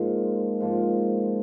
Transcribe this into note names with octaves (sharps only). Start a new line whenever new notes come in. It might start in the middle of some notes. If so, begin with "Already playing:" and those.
Already playing: G#2 F3 A#3
G#2 F3 A#3